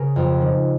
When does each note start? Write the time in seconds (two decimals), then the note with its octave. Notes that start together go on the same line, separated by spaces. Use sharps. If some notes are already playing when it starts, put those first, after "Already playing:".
Already playing: C#3 G#4 A#4 C#5
0.16 F2
0.41 D#3